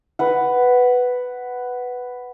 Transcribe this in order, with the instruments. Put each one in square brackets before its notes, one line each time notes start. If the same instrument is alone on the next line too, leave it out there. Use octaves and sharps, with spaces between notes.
[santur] B4 F#5